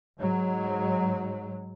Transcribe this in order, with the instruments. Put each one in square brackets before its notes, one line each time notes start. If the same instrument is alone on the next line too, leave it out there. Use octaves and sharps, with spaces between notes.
[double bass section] G#2 F#3